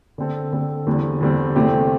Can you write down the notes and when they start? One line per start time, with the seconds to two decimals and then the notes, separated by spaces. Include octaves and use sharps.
0.18 D3 C4 A4
0.53 D3 C4 A4
0.87 E2 D3 G3 C4
1.21 E2 D3 G3 C4
1.55 E2 C3 A3 C4 G4